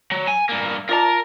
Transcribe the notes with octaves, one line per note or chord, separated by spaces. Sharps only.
F#3
G#5
G2 A#3
F4 A#4 D5 A5 A#5